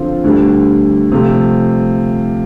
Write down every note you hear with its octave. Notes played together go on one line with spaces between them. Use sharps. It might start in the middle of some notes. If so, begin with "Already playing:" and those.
Already playing: D3 F3 C4 F4
D2 D3 G3
C3 F3 A3